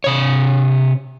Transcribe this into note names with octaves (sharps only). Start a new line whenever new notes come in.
C3 C#5